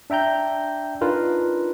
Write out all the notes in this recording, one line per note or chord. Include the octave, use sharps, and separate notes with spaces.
D4 E5 G5 A#5 G6
D4 D#4 F4 A#4 B4